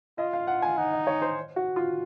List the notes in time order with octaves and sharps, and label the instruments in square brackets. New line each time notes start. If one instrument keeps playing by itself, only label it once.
[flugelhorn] F4 [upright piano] D#5
[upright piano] F5
F#5
G#5
[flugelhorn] D#4 [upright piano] F#5
[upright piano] D#5
C#5
C5
F#4
F4